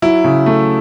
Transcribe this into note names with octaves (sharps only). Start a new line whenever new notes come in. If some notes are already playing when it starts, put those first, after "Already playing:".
F#3 E4
C#3
A3